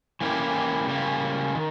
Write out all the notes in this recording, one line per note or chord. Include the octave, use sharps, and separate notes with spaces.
E3 A#3 C#4 E4 G4
C#3 G3 A#3 C#4
D#3